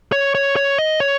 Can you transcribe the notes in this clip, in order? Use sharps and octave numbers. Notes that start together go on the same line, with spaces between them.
C#5
C#5
C#5
D#5
C#5